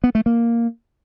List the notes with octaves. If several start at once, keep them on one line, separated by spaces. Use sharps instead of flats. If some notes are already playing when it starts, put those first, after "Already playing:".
B3
A3
A#3